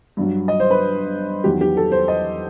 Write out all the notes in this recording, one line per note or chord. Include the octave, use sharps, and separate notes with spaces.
G2 F#3
D#5
C5
B4
E2 D#3 F#3 G4
G4
A4
C5
D#5